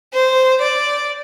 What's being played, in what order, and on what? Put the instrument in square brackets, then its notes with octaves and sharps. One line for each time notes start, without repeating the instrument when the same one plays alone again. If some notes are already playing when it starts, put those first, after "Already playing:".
[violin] C5
D5